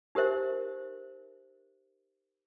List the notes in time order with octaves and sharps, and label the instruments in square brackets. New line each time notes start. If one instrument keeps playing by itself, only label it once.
[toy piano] D#4 G4 A#4 C5 E5